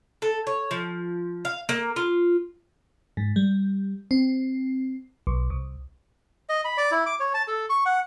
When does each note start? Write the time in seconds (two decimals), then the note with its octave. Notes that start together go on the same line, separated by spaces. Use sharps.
0.22 A4
0.47 C#5
0.71 F3
1.45 F5
1.69 A#3
1.96 F4
3.17 G#2
3.36 G3
4.11 C4
5.27 B1
5.50 C2
6.49 D#5
6.65 B5
6.78 D5
6.91 E4
7.06 D6
7.20 C#5
7.34 A5
7.48 A4
7.70 C#6
7.86 F#5